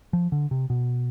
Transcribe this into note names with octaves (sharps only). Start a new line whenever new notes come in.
F3
D3
C3
B2